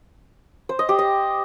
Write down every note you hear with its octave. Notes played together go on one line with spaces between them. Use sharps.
C5
D#5
G4
D#5